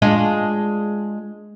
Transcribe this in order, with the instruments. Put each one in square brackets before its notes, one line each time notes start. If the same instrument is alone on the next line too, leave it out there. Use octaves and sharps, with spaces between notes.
[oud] G#3 D4 F4